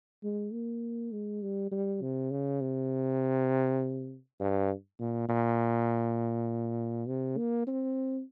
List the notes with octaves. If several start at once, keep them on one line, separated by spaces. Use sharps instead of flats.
G#3
A#3
G#3
G3
G3
C3
C#3
C3
G2
A#2
A#2
C3
A#3
C4